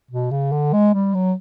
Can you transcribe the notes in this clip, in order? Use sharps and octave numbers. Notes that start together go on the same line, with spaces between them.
B2
C#3
D3
G#3
G3
F#3